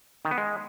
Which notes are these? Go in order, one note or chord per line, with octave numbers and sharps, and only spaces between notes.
D#3
B3
G#3